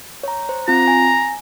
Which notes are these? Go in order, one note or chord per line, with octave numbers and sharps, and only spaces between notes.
C#5 A#5
C5
C4 F4 A#5
G#5